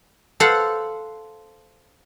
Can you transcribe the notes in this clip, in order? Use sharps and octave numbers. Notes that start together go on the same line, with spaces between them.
A4 C5 F5 F#5